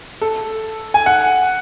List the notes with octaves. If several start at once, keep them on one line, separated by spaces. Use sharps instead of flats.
A4
G#5
F#5